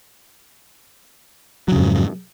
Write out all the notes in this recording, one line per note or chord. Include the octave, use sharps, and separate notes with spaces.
F2 G#2 C#3 F#3